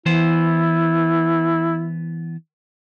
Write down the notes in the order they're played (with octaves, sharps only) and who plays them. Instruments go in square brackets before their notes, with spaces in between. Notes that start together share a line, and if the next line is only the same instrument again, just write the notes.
[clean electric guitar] E3 B3 C5 [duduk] E4